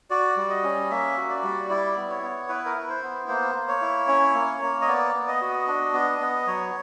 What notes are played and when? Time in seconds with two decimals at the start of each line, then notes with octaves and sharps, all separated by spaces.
0.10 F#4 D5
0.37 G3
0.50 D#5
0.64 C#4
0.90 A#3 E5
1.17 F#4
1.30 D5
1.43 G3
1.70 E4 D5
1.96 B3
2.10 C#5
2.22 B3
2.49 E4 B4
2.66 A#4
2.76 E4 B4
2.90 C5
3.03 B3
3.28 A#3 C5
3.55 A#3
3.68 C#5
3.82 E4
4.08 C#4
4.35 A#3
4.62 A#3
4.81 D#5
4.88 B3 D5
5.15 B3
5.28 D#5
5.41 F#4
5.68 D4
5.94 B3
6.21 B3
6.47 F#3 C#5